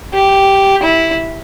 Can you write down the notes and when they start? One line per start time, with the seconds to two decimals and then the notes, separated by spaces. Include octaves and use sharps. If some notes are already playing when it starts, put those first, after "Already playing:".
0.13 G4
0.83 E4